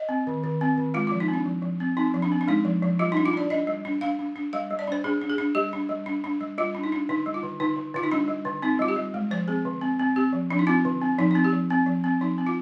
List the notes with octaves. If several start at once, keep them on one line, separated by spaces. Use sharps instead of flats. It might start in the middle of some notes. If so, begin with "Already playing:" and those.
Already playing: D#5
C4
D#3
D#3
C4
D#3
G#3 F4
F3 F4
D#4
C4
D4
F3
F3
C4
C4 D#4
F3
D4
C4
D4
G#3 D#4
F3
F3
G3 F4
D4 D#4
F4
D4 D5
D4 D#5
G3
D4
D4 F5
D4
D4
G3 F5
G3
D5
D4 C5
D4 G#4
D4
G#4
D4
G3 G4
D4
G3
D4
D4
G3
G3 F4
D4
D#4
D4
D3 D#4
G3
F4
D3
D3 D#4
D3
D3 F4
D#4
G3 D4
G3
D3
C4 D#4
G3 F4
G4
G3
G#3
F3 C5
C4 G#4
D3
C4
C4
C4 G4
F3
F3 D4
D#4
C4 F4
D3
C4
F3 D#4
C4 D#4
G4
F3
C4
F3
C4
F3 D#4
C4
F4